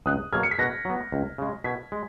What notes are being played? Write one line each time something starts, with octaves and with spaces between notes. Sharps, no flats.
C#2 D#6 F#6
B2 F#3 A#3 F6 G#6
C#7
B6
B2 F#6 A#6
F#3 B3
C#2
C#3 G#3
B2 G#6 B6
G#3